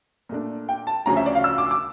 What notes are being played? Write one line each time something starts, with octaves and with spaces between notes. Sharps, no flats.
A#2 A3 D4
G5
A5
D2 C#3 F3 C#4 A#5
E5
D5
F5
E6
D6
D6